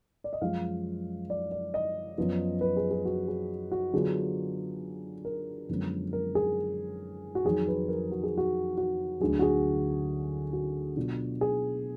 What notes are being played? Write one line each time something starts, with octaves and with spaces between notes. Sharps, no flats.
D5
D#5
F#2 F3 G#3 F5
D5
D5
D#5
F#2 F3 B3
B4
G#4
G#4
F#4
G#4
F#4
D3 F#3 B3 D4 F4 G#4
A#4
F#2 D3 F3 G#3 B3
A#4
G#4
F#4
F2 D#3 F#3 G#4
B4
A#4
F#4
G#4
F#4
F#4
D2 D3 F#3 G#4
F#4
G#4
F#4
B2 F#3 D4 F4
G#4